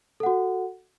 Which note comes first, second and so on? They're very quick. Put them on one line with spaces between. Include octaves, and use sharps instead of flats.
A4 F#5 F#4